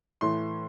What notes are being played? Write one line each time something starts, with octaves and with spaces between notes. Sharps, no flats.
A2 E3 A3 C6